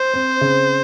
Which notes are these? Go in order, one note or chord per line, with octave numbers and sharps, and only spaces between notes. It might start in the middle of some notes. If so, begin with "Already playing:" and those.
Already playing: C5
C4
C#3